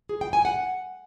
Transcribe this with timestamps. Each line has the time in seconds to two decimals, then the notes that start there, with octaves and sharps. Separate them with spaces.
0.09 G#4
0.21 G5
0.33 G#5
0.45 F#5